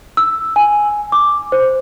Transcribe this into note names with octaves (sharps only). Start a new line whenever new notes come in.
E6
G#5
D6
C5